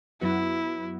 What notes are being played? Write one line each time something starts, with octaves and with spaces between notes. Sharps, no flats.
F#2 F#3 B3 E4 F#4